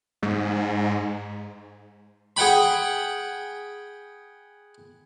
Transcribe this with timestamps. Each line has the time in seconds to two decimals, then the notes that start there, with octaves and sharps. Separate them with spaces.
0.23 G#2
2.36 G#4 F#5 G5 B5